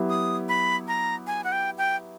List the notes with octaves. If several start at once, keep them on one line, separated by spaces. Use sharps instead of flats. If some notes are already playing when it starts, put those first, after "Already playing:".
Already playing: F#3 B3 E4 G4
D#6
B5
A#5
G#5
F#5
G5
G5